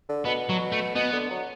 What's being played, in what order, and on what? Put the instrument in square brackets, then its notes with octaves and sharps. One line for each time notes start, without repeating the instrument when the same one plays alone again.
[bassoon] D3
[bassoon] B2 [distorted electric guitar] B3
[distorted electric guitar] F#3
A3
[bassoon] B2 [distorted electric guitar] B3
[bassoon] D3
F#3